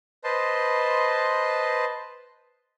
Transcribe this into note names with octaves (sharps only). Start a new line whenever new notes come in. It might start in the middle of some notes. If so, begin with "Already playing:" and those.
B4 C5 D#5 A5 C6